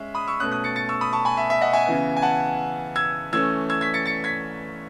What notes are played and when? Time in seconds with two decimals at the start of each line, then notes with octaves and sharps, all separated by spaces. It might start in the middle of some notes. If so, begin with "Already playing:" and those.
Already playing: G#3 C#4 E5
0.15 B5 D#6
0.27 C#6 E6
0.40 B2 A3 C#4 D#6 F#6
0.52 D#6 F#6
0.64 A6 C#7
0.76 A6 C#7
0.89 C#6 E6
1.01 B5 D#6
1.13 A5 C#6
1.25 G#5 B5
1.37 E5
1.50 E5
1.61 D#5 F#5
1.73 E5 G#5
1.86 C#3 E3 B3
2.17 G#5
2.22 F#5 A5
2.96 E6 G#6
3.33 E3 A3 C#4 E6 G#6
3.70 E6 G#6
3.81 G#6 B6
3.94 A6 C#7
4.06 A6 C#7
4.24 G#6 B6